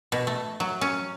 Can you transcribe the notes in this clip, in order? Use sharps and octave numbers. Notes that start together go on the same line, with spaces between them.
B2
A3
F#3
C#4